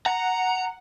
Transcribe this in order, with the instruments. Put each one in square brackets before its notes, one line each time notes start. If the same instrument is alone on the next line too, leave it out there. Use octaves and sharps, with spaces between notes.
[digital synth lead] F#5 [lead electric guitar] A#5